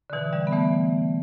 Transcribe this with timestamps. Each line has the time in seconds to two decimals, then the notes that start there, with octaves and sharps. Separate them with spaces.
0.10 D3
0.13 B2 E3
0.33 D3 G3
0.47 B3
0.52 E3 A3